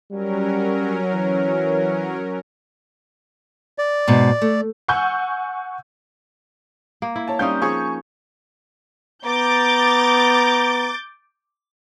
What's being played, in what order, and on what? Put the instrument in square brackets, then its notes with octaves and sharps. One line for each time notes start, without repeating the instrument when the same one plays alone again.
[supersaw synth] F#3 C#4 A#4 [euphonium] G3
[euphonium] E3 [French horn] C#5
[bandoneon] D5
[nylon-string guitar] G#2 B2
A3
[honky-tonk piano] F#5 G#5 C#6 E6 G6
[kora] A#3
E4
[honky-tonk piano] C#5 A5
[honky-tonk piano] G3 F5 G6 [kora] C4 C#4 D#4
[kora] F3 G#4 C#5 [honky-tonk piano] G#5 C#6
[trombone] B3 [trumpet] A#5 [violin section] D6 G6 A6